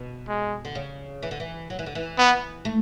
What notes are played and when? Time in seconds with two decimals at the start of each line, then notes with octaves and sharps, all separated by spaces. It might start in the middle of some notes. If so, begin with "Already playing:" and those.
Already playing: B2
0.28 G#3
0.65 D3
0.75 C#3
1.23 E3
1.31 D3
1.40 E3
1.70 F#3
1.79 E3
1.86 D3
1.95 E3
2.18 B3
2.65 A3